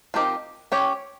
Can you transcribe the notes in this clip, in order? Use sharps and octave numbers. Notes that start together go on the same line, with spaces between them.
F3 C4 D#4 G4 A#4
C#4 G4 C#5